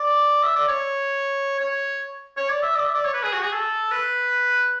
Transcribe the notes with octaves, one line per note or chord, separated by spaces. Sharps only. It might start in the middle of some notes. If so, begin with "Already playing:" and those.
Already playing: D5
E5
D5
C#5
C#5
C#5
D5
E5
D5
E5
D5
C#5
B4
G#4
F#4
G#4
A4
B4